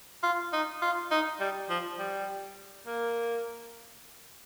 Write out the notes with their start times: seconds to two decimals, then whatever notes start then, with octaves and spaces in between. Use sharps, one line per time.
0.23 F4
0.53 D#4
0.82 F4
1.11 D#4
1.40 G3
1.70 F3
1.99 G3
2.87 A#3